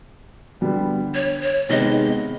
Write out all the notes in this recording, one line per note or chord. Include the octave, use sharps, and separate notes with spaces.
D3 G3 B3
C#5
C#5
C3 D#3 G#3 B3 D#5